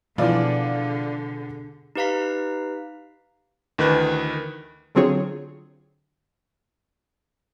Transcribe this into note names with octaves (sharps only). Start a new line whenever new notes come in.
B2 D3 E3 F3 F4 G#4 D5
D#4 G4 B4 F5 A#5 B6
D2 D#3 E3 B4 F#6
D3 F#3 C4 F4 G#4 C#5